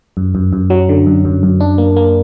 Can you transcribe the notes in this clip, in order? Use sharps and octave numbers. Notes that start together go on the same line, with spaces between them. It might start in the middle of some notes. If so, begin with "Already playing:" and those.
F#2
F#2
F#2
F#3
D3
F#2
F#2
F#2
D4
A#3
A#3